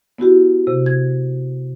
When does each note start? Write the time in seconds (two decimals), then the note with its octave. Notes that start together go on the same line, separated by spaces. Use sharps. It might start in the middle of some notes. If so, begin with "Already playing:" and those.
0.18 B3 E4 F#4 G4
0.67 C3
0.86 G#6